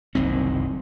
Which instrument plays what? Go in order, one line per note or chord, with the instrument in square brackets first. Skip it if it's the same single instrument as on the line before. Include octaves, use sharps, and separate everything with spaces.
[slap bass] F#1 C2 D#3 C4